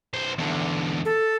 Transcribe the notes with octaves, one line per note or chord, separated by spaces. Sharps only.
B1 C5
E2 D3
A4